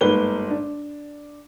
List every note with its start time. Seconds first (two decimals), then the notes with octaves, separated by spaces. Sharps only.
0.01 G1 G#2 A#3 B4 G7
0.50 D4